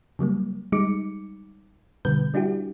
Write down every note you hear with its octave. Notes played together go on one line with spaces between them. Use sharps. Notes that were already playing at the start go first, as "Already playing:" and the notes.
C#3 F#3 G3 A#3
G3 G#3 D#4 D6 C#7
B2 D3 G3 B4 G6
G3 D4 E4 F#4 G4